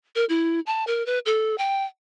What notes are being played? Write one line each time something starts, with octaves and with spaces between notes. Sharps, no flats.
A#4
E4
A5
A#4
B4
A4
G5